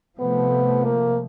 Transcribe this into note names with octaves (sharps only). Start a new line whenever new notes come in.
C3 F3 A3 B3
A#3